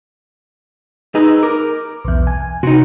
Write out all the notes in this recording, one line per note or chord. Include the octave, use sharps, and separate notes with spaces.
D#4 G#4 B4 D#5 A#5 E6
A#4 D6
B1 E2
G#5
C3 D#4 F#4